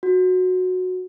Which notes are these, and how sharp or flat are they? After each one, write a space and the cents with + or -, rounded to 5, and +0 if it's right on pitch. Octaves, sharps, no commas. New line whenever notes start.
F#4 -10